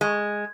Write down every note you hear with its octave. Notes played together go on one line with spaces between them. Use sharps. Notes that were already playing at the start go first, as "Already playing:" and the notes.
G#3